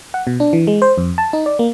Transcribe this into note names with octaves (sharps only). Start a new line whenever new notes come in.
F#5
B2
D4
E3
G#3
C5
F2
A5
D#4
D5
A#3